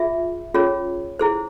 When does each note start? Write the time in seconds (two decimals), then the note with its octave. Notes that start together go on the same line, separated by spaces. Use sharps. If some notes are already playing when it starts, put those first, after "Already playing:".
Already playing: F4 G#4 E5
0.54 C#4 F4 G#4 C#5
1.19 E4 G#4 C5